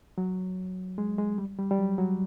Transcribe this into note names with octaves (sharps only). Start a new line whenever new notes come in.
F#3
G#3
G#3
G3
G3
G3
F#3
F#3